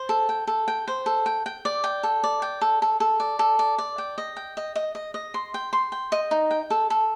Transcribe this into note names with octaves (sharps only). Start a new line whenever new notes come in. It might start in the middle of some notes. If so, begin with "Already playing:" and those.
Already playing: C5
A4
G5
A4
G5
C5
A4
G5
G5
D5
G5
A4
D5
G5
A4
A4
A4
D5
A4
D5
D5
G5
D#5
G5
D#5
D#5
D#5
D#5
C6
G5
C6
G5
D#5
D#4
G5
A4
A4